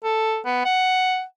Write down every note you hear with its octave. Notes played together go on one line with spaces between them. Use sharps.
A4
B3
F#5